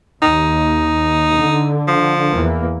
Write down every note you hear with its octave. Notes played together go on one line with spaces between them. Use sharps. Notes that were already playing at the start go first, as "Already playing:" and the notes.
D#2 D#4
D3
F3
E2 E3 A#3